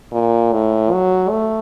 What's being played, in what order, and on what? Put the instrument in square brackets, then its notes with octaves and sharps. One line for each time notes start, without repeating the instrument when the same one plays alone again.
[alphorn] A#2
A2
F#3
A3